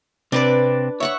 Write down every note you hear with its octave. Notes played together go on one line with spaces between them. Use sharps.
C3 C4 D4 B4 D5
C#5 E5 F#5 C#6